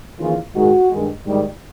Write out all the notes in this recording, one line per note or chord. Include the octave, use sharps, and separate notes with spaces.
D#2 C#3 E3 F4
G#2 D#3 G#3 F#4
G2 D#3 G#3
G#2 D#3 G3